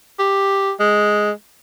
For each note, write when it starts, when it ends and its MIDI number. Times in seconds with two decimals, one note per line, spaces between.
0.19 0.72 67
0.79 1.31 56